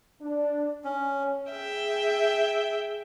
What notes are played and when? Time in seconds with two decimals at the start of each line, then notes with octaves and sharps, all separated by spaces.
0.21 D4
0.84 C#4
1.51 G#4 E5 G5